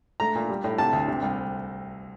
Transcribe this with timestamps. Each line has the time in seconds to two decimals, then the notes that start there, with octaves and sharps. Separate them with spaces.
0.20 A3 A#5
0.36 A#2
0.49 G3
0.64 A2
0.78 C3 A5
0.93 D2
1.08 C3
1.22 C2